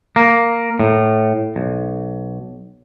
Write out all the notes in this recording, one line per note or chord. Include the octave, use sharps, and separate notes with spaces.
A#3
A2
B1